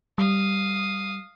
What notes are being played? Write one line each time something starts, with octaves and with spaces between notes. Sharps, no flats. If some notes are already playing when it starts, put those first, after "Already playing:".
G3 F5 D#6